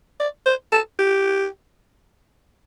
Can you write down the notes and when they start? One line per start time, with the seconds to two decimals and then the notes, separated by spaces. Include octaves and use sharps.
0.20 D5
0.46 C5
0.72 A4
0.99 G4